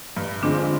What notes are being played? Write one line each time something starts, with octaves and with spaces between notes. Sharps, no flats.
G2
D3 F3 G#3 C4 D4